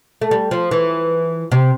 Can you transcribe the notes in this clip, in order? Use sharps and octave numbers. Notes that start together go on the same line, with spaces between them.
A3
G3
F3
E3
C3